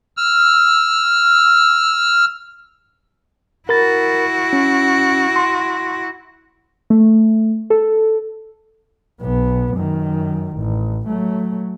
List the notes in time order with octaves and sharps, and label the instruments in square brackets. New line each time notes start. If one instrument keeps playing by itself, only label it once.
[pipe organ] E6 F6
[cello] E4 F#4 [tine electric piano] A#4 B5 A6
[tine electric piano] C#4
C6
[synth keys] A3
A4
[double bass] B1 B3
F#2 D#3
A1
F#3 A3